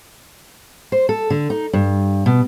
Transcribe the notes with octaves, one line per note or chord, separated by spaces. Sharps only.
C5
A4
D3
D#4
G2
B2